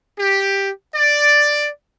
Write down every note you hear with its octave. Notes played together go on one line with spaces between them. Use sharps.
G4
D5